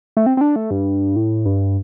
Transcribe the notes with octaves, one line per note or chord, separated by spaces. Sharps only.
A3
C4
C4
D4
A3
G2
A2
G2